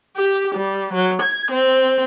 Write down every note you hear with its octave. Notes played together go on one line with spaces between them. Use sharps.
G4
G3
F#3
G#6
C4